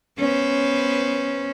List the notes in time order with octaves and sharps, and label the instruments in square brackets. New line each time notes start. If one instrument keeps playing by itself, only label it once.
[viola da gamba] B3 B4 C5 [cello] C#4